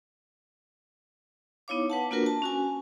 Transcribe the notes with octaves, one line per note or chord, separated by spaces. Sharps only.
B3 D#4 E4 C#5 F5 D6
B4 F#5 A5
A#3 D4 F4 F#4 A#4 B4
A5
C#4 F#4 G#5